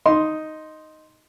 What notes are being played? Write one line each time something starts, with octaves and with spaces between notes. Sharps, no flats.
D#4 D#5 C6